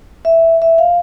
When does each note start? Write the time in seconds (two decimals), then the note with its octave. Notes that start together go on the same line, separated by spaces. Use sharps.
0.25 E5
0.62 E5
0.78 F5